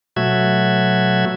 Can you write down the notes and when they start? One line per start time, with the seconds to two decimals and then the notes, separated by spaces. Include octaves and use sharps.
0.16 B2 F#3 A3 F#4 E5 G#6